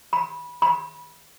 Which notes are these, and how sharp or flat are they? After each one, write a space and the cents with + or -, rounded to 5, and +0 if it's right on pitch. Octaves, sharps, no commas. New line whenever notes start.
B5 -20
B5 -25